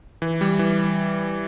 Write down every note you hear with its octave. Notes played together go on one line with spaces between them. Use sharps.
E3
G3
E3